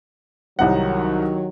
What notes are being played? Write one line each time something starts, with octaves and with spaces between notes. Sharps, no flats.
C2 D#3 F#3 D#4 F#5